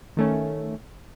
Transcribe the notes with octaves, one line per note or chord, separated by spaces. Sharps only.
D#3 A3 C#4